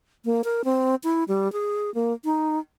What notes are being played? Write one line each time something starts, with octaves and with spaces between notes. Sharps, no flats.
A#3
A#4
C4
E4
G3
G#4
A#3
D#4